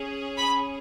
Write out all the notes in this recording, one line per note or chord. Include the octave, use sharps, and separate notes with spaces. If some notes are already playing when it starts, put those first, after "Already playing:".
Already playing: C#4 G#4
B5